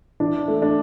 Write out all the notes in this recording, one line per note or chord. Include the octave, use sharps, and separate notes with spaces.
E3 D4
A3
D4